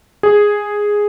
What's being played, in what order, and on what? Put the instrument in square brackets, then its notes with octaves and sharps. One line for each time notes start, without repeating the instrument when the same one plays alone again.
[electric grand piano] G#4